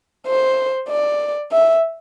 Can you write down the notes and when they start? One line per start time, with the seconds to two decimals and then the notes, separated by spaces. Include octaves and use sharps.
0.27 C5
0.89 D5
1.52 E5